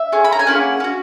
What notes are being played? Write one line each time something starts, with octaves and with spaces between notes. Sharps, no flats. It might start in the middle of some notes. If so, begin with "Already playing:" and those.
Already playing: E5
C#4 G#4
B5
A#5
G#5
A#3 C#4 E4 G#4 F#5
C#4 F#4